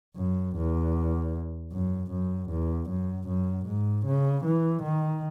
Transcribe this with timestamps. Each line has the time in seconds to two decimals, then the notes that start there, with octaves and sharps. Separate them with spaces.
0.17 F#2
0.56 E2
1.72 F#2
2.11 F#2
2.50 E2
2.89 F#2
3.28 F#2
3.66 G#2
4.06 C#3
4.45 E3
4.83 D#3